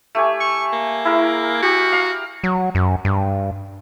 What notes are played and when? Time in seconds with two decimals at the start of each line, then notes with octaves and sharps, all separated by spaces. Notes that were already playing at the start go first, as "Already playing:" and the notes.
0.15 A3 G4 G#5
0.40 C#6
0.73 A#3
1.05 E4 G#4 A#4
1.63 F#4 G4
1.92 F5 A#5
2.44 F#3
2.75 F#2
3.05 G2